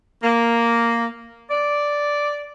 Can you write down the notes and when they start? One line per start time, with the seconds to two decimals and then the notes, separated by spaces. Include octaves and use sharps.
0.23 A#3
1.50 D5